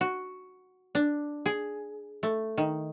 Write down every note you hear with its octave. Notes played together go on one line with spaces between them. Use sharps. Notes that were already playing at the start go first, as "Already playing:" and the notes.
F#4
D4
G#4
A3
D#3